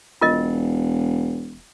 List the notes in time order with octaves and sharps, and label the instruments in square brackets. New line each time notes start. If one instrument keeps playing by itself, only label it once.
[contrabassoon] E1 [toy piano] F4 A#4 D#5